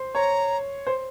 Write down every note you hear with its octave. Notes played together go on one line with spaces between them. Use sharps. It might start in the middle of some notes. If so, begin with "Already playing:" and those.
Already playing: C5
C#5 A#5
C5